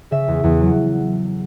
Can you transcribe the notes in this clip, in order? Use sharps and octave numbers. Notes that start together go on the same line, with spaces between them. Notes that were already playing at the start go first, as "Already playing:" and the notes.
C#3 E5
E2
E2
F#3